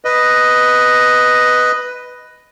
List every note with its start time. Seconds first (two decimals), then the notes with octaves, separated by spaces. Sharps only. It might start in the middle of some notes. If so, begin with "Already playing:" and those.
0.05 B4 D#5